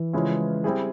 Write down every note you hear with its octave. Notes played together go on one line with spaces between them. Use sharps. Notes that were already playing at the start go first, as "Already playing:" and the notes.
Already playing: E3
C#3 F3 G#3 C#4 E4
G3 C4 E4 G#4